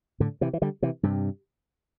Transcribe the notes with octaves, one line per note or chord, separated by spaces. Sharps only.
A2 D3
C3 E3
E3
D3 G3
C3 E3
G2 C3